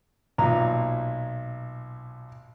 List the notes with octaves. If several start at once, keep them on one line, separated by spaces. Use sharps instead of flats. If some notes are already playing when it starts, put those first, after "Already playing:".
B1 A#2 A#5